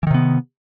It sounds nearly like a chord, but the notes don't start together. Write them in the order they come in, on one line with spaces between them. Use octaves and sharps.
E3 D#3 C3 B3